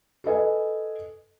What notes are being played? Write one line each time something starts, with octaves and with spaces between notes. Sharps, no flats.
A4 B4 D#5 G#5